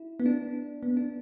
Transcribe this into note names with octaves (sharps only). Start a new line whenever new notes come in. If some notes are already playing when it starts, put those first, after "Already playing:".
Already playing: E4
B3
D4
B3
D4